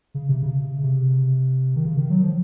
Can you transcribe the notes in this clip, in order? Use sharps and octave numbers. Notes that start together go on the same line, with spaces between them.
C#3
C3
C#3
C3
D#3
C#3
D#3
F#3
F3